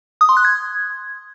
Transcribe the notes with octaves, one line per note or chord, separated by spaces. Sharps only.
D#6
C6
F#6
G#6